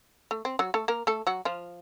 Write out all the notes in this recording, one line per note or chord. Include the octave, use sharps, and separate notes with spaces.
A3
C4
F#3 F#4
A3 A4
A#3 A#4
A3 A4
F#3 F#4
F3 F4